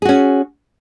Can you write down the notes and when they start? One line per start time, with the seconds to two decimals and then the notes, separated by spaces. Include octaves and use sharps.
0.02 G#4
0.05 F#4
0.09 C#4